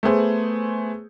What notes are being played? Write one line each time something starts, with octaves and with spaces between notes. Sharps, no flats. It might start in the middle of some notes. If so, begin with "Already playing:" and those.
A3 B3 G#4 C5